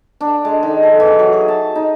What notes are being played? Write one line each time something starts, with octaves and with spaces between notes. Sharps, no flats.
D4
G#3
D#3
A4
E3
F#3
G#4
A5
D#4